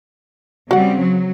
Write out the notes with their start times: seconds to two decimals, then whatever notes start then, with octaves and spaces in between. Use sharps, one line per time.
0.71 C#3 G3 C4 F#4 F#5
0.99 F#3